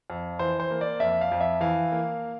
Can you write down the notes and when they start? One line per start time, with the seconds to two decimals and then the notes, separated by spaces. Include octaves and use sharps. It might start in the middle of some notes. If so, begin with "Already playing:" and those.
0.10 F2
0.39 E3 C5
0.60 C5
0.71 A#3
0.81 D5
1.00 F2 E5
1.21 F5
1.32 F2
1.40 E5
1.61 E3 F5
1.92 A#3